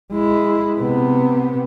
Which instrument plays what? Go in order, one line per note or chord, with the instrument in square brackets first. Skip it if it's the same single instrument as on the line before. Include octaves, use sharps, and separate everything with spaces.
[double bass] G#3 E4
C3 B3